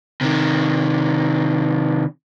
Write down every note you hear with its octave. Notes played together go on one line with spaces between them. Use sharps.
C3 D#3